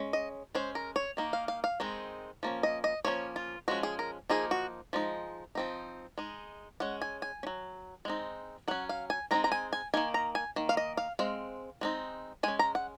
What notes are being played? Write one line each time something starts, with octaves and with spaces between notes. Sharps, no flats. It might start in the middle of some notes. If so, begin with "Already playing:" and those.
Already playing: G#3 C#4
D#5
G#3 C#4 C5
A#4
C#5
D#3 A#3 D#4
F5
F5
F5
D#3 G#3 C4 D#4
F3 A#3 C#4
D#5
D#5
F3 A#3 C#4 C#5
F4
F3 G#3 C#4 F#4
G#4
A#4
F3 A#3 D#4 G#4
F#4
F3 G#3 D#4
F3 C4 D#4
G#3 D#4
G#3 C#4 F#5
G#5
G#5
C#4
F#3
G#3 C4 D#4
F#3 C#4 F#5
F5
G#5
G#3 C4 D#4 A#5
A#5
G#5
G#5
D#3 A#3 D#4 G#5
A#5
G#5
D#3 A#3
F5
D#5
F5
G#3 C4 F5
G#3 C4 D#4
G#3 C#4 G#5
A#5
F#5